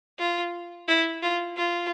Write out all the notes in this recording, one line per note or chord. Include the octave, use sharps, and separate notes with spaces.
F4
E4
F4
F4